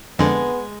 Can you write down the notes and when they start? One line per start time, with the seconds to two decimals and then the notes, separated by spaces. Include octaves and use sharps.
0.19 F2 D3 G#3 B3